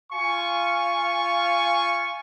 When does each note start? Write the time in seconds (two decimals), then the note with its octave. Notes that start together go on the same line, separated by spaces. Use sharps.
0.13 F4 F5 G#5 C#6